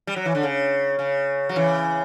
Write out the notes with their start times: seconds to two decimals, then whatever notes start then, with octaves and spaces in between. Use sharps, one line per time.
0.07 G3
0.16 F#3
0.26 E3
0.35 D3
0.43 C#3
0.99 C#3
1.49 F#3
1.56 C#3 E3